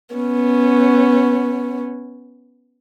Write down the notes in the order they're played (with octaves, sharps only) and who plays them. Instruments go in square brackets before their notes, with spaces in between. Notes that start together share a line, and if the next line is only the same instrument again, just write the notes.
[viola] B3 C#4